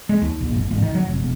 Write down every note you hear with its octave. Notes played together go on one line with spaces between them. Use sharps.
G#3
D#2
A#1
F#1
G#1
D#3
F#3
F1
E1